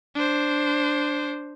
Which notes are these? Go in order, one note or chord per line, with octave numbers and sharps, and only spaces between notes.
D4 C5